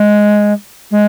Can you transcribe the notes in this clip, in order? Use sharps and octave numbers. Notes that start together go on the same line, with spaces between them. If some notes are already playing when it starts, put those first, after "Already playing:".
Already playing: G#3
G#3